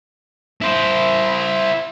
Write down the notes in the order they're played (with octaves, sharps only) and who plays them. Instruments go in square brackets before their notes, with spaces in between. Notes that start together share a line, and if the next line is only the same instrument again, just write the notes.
[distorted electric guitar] E4 C5